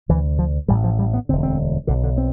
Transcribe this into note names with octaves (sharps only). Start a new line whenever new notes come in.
D2 C3 E3
F3
A1 A2 G3
F3
G3
B3
E1 D2 D3 C4
C4
B1 B2 D3
D3
C4